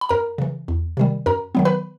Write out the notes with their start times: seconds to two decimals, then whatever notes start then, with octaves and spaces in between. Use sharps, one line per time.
0.01 B5
0.09 F#2 A#4 A#5
0.38 C#3 E3
0.68 E2
0.97 C3 D#3 G3
1.26 F#2 A#4 A#5
1.55 D#3 F#3 B3
1.65 B4 B5